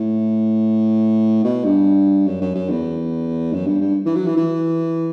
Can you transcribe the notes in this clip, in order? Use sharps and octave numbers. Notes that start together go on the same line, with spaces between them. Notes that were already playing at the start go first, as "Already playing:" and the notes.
Already playing: A2
B2
G2
F#2
F#2
F#2
E2
F#2
G2
G2
E3
F#3
E3
E3